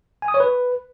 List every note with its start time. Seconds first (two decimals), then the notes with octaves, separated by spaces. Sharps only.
0.22 G#5
0.28 D#6
0.34 C#5
0.40 B4